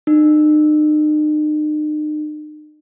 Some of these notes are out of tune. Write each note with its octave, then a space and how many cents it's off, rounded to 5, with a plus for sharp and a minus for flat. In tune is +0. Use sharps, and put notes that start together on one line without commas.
D#4 -45